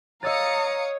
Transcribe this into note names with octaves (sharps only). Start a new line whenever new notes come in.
C#5 D#5 F5 A#5 D#6 E6 A6 C#7